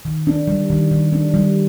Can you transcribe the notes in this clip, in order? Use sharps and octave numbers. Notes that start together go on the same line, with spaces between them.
D#3
D4
G3
D#3
D#3
D4
G3